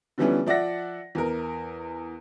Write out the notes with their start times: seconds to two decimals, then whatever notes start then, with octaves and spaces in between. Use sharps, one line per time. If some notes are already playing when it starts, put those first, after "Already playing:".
0.18 D3 E3 F3 G3 B3 C#4
0.46 F3 D5 E5 F#5 A#6
1.15 E2 A#4